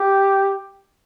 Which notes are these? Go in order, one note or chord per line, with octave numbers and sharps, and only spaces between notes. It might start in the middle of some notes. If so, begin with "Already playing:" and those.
Already playing: G4